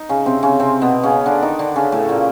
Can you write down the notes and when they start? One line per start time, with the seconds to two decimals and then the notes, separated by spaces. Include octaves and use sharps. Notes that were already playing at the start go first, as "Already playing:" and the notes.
Already playing: D#4
0.09 C#3 C#4
0.26 C3 C4
0.43 C#3 C#4
0.60 C3 C4
0.82 B2 B3
1.03 C#3 C#4
1.26 D3 D4
1.42 D#3 D#4
1.59 D3 D4
1.76 C#3 C#4
1.92 A2 A3
2.09 A#2 A#3